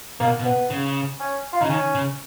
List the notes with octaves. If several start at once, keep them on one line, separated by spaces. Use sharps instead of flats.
B2 A#3
B2
B3
C#3
C#4
F4
C#3 D#4
D#3 C#4
C#3